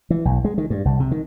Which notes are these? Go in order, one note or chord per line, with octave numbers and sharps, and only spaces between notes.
E3
B1
G#3
D#3
G2
C2
C3
D#3